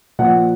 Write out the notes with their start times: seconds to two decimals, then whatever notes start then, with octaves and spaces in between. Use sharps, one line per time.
0.19 A#2 F3 F#5